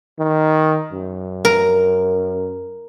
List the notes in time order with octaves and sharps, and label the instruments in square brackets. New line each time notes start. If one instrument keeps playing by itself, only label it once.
[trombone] D#3
F#2
[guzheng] A#4